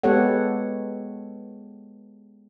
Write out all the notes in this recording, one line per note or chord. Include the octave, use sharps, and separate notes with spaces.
G#3 B3 G4 A4 C#5 F#5